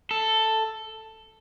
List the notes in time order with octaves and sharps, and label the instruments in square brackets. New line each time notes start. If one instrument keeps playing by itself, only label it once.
[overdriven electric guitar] A4